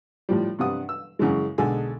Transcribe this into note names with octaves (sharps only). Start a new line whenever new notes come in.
A2 F3 G3
G2 C3 G3 F#5 D#6
E6
F#2 C#3 E3 G#3
B1 D3 G#3 G#4 A4 G#5